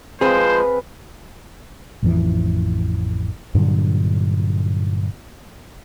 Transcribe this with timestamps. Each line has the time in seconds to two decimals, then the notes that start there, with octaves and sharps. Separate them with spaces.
0.21 F3 G#3 C4 G#4 B4 C5 F5 G5
2.03 A1 F2 E3
3.55 G2 A#2 D3 F#3